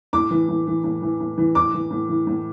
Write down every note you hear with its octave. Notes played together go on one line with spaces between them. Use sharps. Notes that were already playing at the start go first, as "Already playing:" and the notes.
A2 D6
E3
A2
E3
A2
E3
A2
E3
A2 D6
E3
A2
E3
A2